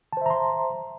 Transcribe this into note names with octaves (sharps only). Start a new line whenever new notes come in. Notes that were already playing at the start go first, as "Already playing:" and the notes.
C5 E5 A5 A#5 C6